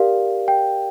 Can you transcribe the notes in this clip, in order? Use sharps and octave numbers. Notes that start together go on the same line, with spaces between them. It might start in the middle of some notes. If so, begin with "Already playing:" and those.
Already playing: G4 A#4 D5 F5
G5